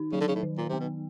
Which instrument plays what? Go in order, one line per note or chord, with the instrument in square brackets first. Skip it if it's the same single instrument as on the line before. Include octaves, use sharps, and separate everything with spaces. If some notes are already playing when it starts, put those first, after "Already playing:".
Already playing: [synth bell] D#3 D#4
[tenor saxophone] C#3 [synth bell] F#3
[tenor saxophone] D3
C#3
A2
[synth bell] D#3
[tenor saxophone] A#2
[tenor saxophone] C3 [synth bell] B3
[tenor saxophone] B2